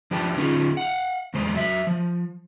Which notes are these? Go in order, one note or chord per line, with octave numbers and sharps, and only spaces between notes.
F3 D4 G4 B4 G5 A5
D3 C#4 D#4 F4 G#4
F5 F#5
E2 C#3 G#3 C5
F#3 E5
F3